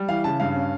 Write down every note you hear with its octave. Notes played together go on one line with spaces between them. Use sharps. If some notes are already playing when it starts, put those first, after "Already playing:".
Already playing: G3
E3 F5
C#3 A5
G2 F5
C#4